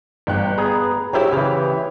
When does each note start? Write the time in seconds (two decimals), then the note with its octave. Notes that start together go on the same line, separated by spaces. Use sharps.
0.27 G1 G5 F#6
0.58 B3 G#4 A#5
1.13 F#3 E4 G4 C5 C#5 E5
1.32 C#3 E3